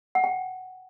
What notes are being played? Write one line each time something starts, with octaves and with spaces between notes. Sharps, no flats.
F#5
G5